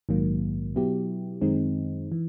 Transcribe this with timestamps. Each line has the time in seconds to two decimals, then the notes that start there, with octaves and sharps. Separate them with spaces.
0.09 A#1 G#2 D#3 F#3 A#3
0.75 B2 F#3 B3 E4 G4
1.41 F#2 D#3 G#3 C4 D#4
2.12 E3